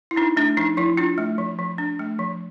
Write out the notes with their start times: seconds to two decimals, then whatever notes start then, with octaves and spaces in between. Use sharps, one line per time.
0.11 E4
0.16 D4 D#4
0.37 A3 D4
0.57 F3 D#4
0.77 F3 E4
0.97 D4 F4
1.18 A3
1.38 F3
1.59 F3
1.78 D4
1.99 A3
2.19 F3